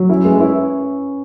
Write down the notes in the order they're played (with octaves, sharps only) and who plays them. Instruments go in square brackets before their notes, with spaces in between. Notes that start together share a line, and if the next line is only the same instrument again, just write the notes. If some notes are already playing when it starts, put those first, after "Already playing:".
Already playing: [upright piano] F#3
[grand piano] C#4 [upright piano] E4
[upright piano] G#3 [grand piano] B4
[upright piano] E4 [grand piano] C#5